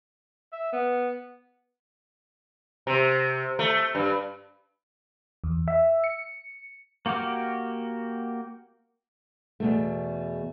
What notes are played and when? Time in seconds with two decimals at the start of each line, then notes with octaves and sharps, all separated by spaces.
0.53 E5
0.72 B3
2.87 C3
3.59 A3
3.95 G2
5.44 E2
5.68 E5
6.04 C#7
7.06 A#3 F#4 G4 D6 F6
9.60 E2 B2 A3